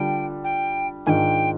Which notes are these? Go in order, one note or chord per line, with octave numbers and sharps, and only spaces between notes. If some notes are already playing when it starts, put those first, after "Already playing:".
Already playing: D3 G3 D4 F4 G5
G5
G#2 D#3 G#3 D4 F4 G5 G#5